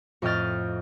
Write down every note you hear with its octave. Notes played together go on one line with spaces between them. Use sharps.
F2 A2 D#5 G5 F6 A6